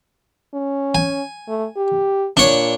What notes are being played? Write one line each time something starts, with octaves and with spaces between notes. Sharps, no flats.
C#4
G#5
A3
G4
A#2 D4 C#5